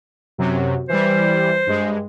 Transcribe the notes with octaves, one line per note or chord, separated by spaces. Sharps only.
F#2 C3 F#3
E3 G3 C5
G2 G#3